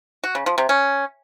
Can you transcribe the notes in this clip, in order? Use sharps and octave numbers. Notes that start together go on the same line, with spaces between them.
F#4
C#3
F3
C3
C#4